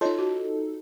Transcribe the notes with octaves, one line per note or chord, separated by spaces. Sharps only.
D#4 F4 A4 C#5 D#5
F#4